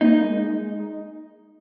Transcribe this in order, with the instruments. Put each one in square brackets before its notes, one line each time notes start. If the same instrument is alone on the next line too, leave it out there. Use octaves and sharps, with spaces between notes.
[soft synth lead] A#3 [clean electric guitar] D#4
[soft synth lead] G#3
G#3
D#4